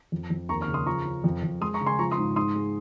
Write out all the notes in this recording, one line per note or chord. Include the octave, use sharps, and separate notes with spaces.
F2
F2
D#2 A#5 C#6
C#6 F6
C#3
C6 D#6
F3 A#5 C#6
C#3
F2
F2
G#3 C6 D#6
A#5 C#6
C#3
G#5 C6
F3 A#5 C#6
C6 D#6
G#2
G#2 C6 D#6
G#3